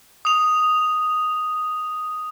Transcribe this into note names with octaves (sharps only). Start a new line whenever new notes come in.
D#6 F7